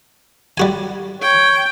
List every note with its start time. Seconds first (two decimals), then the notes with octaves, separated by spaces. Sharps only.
0.58 G3 F#4 G#5
1.22 C#5 G5